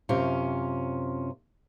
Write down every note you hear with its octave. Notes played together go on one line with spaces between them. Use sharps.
F#2 C3 C#4 F4